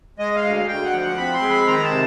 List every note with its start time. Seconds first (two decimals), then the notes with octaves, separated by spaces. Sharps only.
0.19 G#3 D#5
0.36 F5
0.44 D2
0.68 D2 G5
0.85 F#5
0.93 F3
1.01 F#5
1.17 C4 B5
1.34 C6
1.42 G#3
1.50 B5
1.67 D#3 A#5
1.83 A5
1.91 C3